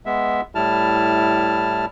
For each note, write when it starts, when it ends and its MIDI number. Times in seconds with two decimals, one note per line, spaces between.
0.06 0.41 56
0.06 0.41 59
0.06 0.41 76
0.55 1.85 45
0.55 1.85 55
0.55 1.85 64
0.55 1.85 81
0.55 1.85 89